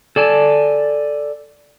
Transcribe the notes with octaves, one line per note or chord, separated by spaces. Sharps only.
A4 D5 G#5 A5